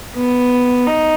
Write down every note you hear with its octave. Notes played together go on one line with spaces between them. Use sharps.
B3
D#4